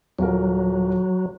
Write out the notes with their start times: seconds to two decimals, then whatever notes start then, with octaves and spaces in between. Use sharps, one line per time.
0.19 D#1 F#3 A#4